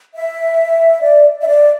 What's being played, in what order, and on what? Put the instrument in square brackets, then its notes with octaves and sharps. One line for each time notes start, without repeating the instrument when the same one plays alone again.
[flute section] E5
D5
E5
D5